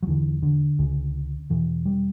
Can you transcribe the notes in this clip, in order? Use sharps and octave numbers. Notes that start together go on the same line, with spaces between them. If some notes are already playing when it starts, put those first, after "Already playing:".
F#3
E2 D3 E3
D3
C#2 C#3
E2 B2 E3
G3